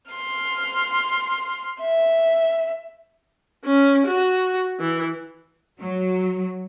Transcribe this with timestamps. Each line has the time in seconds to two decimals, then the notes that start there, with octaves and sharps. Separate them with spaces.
0.11 C6 F6
1.82 E5
3.65 C#4
4.07 F#4
4.80 E3
5.80 F#3